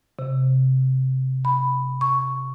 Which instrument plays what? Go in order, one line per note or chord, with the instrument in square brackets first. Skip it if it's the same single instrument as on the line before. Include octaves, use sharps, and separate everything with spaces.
[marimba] C3
B5
C#6